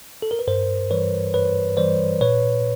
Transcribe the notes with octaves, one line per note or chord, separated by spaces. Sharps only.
A4
A#4
B4
G2 A#4 C5
E3 G3 B4 C#5
G2 B4 C#5
E3 G3 C5 D5
A#2 B4 C#5